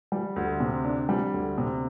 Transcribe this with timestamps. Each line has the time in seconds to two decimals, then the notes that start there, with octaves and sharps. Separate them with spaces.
0.12 G3
0.36 D2
0.60 C3
0.85 D4
1.09 G3
1.34 D2
1.58 C3